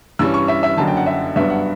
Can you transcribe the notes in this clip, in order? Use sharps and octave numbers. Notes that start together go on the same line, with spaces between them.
G2 E3 G3 C#4 E6
C#6
E5
E5
F#1 F#2 D3 A5
G5
F#5
E5
G2 F#3 B3 D4 E5
F#5